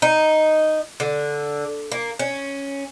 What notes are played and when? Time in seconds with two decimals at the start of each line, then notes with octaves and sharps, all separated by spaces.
0.02 D#4
1.00 D3
1.92 A#3
2.19 C#4